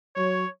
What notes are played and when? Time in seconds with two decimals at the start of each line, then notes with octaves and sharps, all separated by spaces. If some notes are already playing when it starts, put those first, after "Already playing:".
0.16 F#3 C#5